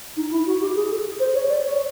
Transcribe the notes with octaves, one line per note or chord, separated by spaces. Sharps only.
D#4
E4
F#4
G4
G#4
A4
C5
C#5
D5
C#5